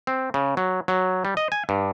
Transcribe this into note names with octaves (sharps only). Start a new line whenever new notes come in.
C4
C#3
F#3
F#3
G3
D#5
G#5
G2